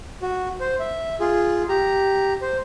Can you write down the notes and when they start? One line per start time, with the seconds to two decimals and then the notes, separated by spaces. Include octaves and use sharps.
0.22 F#4
0.60 C5
0.79 E5
1.20 F4 G#4
1.69 G4 A#5
2.42 C5